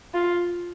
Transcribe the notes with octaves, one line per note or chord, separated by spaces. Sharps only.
F4